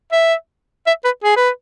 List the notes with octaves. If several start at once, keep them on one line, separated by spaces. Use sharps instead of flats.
E5
E5
B4
G#4
B4